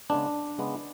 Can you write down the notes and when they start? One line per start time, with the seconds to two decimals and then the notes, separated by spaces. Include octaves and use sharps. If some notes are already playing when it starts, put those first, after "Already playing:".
0.10 C#3 G#3 B3 D4
0.58 C#3 G#3 B3